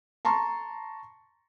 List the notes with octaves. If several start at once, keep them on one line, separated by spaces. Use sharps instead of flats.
A5 A#5 C6 C#6